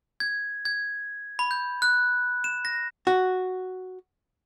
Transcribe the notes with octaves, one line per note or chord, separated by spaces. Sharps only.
G#6
G#6
B5
G6
F#6
E7
A#6
F#4